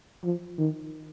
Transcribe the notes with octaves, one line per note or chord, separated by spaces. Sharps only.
F3
D#3